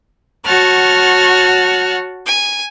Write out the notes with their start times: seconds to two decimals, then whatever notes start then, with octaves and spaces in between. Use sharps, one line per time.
0.46 F#4 C#5 F#5 A5 F6
2.27 G#5